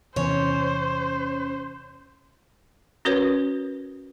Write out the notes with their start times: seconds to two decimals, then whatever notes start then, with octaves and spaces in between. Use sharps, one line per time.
0.16 E2 C3 E3 C#4 C5 C#5
3.05 C#4 F#4 A#4 B4 C#5